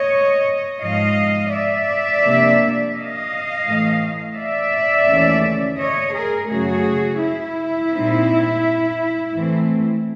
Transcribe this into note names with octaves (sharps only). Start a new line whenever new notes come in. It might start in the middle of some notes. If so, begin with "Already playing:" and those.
Already playing: C#5 D#5
G#2 F3 G#3 D#5 F5
D5 E5
C3 F3 A#3 D4
D#5 F5
A2 E3 A3
D5 E5
D#2 C#3 E3 A3 C#4
C#5 D#5
G#4 A#4
F#2 C#3 F#3 A3 F#4 G#4
E4
A#2 G3 C4 D#4
A2 E3 A3 C4